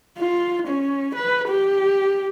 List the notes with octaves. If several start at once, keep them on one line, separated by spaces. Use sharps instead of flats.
F4
C#4
B4
G4